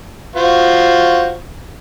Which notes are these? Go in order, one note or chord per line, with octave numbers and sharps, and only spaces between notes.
F4 F#4 C5